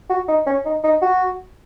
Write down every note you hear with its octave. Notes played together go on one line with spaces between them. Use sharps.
F#4
D#4
C#4
D#4
D#4
F#4